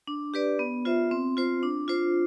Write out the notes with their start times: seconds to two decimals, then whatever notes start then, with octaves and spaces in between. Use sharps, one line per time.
0.07 D4
0.34 G4 B4 D5
0.59 B3
0.85 F4 C5 E5
1.11 C4
1.37 F4 C5
1.63 D4
1.88 F4 C5